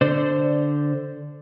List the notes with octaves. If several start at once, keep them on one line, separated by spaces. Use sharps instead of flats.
D3 C5 D5